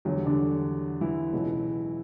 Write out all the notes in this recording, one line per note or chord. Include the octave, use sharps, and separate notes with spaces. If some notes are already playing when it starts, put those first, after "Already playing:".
E2 D3 F#3
G3
D3 D4
E3 E4
C#2 B2 F#3